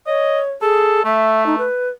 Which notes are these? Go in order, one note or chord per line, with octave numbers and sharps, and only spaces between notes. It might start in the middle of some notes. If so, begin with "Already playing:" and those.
C#5 D#5
G#4 A4
A3 E5
D#4
B4